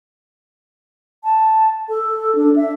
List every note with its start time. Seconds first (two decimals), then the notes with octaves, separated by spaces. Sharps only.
1.24 A5
1.89 A4
2.35 D4
2.56 E5